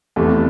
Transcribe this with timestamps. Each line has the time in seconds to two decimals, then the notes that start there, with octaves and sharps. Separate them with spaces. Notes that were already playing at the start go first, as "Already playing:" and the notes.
0.16 F1 E2 C3 E3 A3